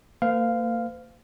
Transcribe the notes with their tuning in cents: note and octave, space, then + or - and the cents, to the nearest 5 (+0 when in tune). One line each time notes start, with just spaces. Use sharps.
A#3 -35 C5 -45 F5 +0